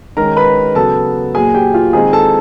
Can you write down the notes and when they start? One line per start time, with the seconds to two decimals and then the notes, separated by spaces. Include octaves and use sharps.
0.17 D#3 G#3 C#4 A#4 A#5
0.37 B4 B5
0.75 C#3 F#3 B3 A4 A5
1.35 A#2 F#3 A#3 G#4 G#5
1.54 G4 G5
1.74 F4 F5
1.93 D#3 G#3 C4 D#4 G#4 G#5
2.13 A4 A5